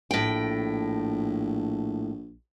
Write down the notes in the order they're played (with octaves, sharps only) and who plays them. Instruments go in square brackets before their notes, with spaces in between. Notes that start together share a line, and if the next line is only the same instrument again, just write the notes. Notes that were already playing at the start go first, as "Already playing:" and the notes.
[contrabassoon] A#1 [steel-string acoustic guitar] A2 G5